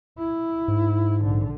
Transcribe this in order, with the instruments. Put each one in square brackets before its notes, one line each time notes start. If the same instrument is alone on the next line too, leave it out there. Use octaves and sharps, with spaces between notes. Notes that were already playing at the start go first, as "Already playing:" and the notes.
[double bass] E4
[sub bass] G#2
[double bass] A#1 D3